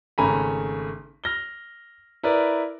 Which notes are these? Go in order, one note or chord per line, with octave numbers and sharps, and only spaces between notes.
G#1 C#3 A3 G#5 A#5 B5
F6 A#6 G7
E4 A#4 B4 D5